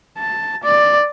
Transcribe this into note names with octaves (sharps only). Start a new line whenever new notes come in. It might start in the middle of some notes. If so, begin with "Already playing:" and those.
A5
D5